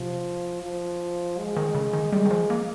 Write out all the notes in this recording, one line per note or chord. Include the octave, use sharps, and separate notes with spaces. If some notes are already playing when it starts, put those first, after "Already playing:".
Already playing: C3 F3
F3
G#3
D#3
C#3
D#3
G3 G#3
D#3
F3
A#3